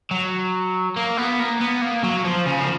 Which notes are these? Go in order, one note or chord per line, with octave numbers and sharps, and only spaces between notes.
F#3
A#3
B3
A#3
B3
A#3
F#3
F3
C#3
F3